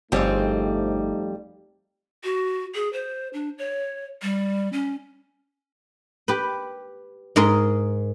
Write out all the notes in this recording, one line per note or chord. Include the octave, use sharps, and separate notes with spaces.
G1 F2 G3 A3 C4 D#4 G#4 C#5
F#4
G#4
C5
D4
C#5
G3
C#4
G4 B4
G#2 G#3 A#4 D#5